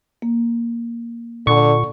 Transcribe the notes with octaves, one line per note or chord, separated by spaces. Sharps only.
A#3
A#2 D3 C#6